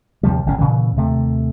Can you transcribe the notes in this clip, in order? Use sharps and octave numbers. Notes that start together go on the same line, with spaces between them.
D#2 C3 F3 G3
G1 A2 C#3 C#4
A#2 C#3 E3
D#2 C3 A3